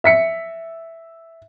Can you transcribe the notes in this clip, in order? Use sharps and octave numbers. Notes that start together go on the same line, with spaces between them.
E5 B6 C#7